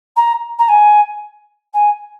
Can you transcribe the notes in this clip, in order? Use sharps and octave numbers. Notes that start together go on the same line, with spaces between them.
A#5
A#5
G#5
G#5